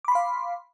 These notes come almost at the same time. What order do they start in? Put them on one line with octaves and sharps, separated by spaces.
D6 B5 C6 F5